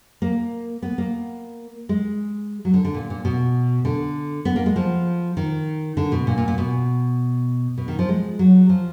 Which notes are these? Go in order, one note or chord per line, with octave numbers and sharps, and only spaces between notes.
A#3
B3
A#3
G#3
F#3
D3
D3
A#2
A#2
B2
D3
B3
A#3
G#3
F3
D#3
D3
B2
A#2
A#2
A#2
B2
B2
D#3
F3
G#3
F#3
F3